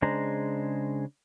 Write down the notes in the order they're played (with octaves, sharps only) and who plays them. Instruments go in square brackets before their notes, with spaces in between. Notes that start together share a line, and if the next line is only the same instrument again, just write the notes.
[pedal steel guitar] C#3 G#3 D4 C5 A#5